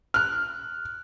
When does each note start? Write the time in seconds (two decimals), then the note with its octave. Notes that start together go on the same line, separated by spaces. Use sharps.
0.14 F6 F#6